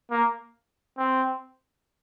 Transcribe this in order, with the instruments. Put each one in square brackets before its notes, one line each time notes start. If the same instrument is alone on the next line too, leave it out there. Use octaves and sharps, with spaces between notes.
[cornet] A#3
C4